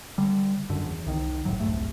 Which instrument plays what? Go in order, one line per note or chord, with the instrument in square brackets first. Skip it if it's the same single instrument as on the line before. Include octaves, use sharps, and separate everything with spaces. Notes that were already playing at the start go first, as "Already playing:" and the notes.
[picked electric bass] D3 G3
F#2 D3
E2
C2 D#3
F#1 A2 F#3
D1 A#1 G2 A3